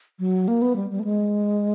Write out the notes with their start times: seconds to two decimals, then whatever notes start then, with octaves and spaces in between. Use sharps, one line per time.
0.19 F#3
0.48 A#3
0.62 B3
0.76 G3
0.90 G3
0.99 A3
1.04 G#3